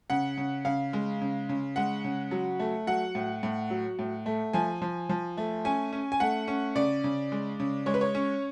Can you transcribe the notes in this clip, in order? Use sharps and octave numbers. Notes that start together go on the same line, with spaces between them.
C#3 F#5
C#3
C#3 F5
G#3
C#3
C#3
G#3 F#5
C#3
F#3
A3
F#3 F#5
A2
A2
F#3
A2
A3
F3 G#5
F3
F3
A3
C#4 G#5
C#4
G#5
A3 F#5
C#4
C#3 D5
C#3
G#3
C#3
G#3 C#5
B4
C#5
C#4